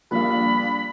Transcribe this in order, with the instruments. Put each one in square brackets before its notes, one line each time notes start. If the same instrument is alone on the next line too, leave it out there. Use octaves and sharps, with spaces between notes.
[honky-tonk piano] A#1 F5 [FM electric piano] G3 A#3 F4 [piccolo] B5